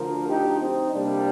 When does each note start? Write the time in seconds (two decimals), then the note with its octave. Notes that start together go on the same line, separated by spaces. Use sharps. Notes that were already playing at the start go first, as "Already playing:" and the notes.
Already playing: D2 D3 F3 A#4
0.27 D#4 G4
0.59 C4 D#4
0.92 C2 C3 G3 A#3 D4